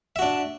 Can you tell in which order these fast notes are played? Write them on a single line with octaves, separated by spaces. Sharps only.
E5 F#4 D4